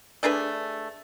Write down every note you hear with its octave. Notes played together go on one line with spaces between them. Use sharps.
A3 D4 G#4 B4